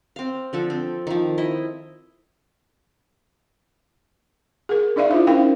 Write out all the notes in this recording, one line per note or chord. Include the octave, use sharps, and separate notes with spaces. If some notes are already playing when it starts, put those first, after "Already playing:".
C4 F5
D3 F3 A4
C4
D#3 F3
E4 D#5
G#4 A#4
D4 D#4 D5 E5 F5
E4 F4 C5 E5
C#4 D#4 A#4 C5 F5 G5